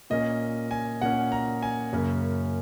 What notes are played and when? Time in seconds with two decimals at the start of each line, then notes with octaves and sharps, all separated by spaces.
0.10 A#2 A#3 C#4 D#5
0.71 G#5
1.01 A#2 A#3 C#4 F#5
1.32 A#5
1.62 G#5
1.92 F#2 C#3 A#3 C#4